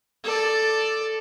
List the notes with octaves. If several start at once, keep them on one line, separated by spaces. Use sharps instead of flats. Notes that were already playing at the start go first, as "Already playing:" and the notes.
A4 D5